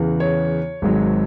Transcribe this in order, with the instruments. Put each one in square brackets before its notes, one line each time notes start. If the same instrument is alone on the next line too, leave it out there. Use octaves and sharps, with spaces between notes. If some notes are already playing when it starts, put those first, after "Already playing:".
Already playing: [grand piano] E2 C#3 E3
C#5
G#1 G#2 F#3